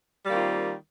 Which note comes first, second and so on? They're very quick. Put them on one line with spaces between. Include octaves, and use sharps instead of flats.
G3 A#3 D#3 C4 F4